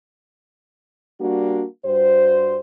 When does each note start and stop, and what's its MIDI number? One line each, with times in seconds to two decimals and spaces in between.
1.21 1.64 55
1.21 1.64 58
1.21 1.64 62
1.21 1.64 66
1.85 2.59 43
1.85 2.59 55
1.85 2.59 66
1.85 2.59 72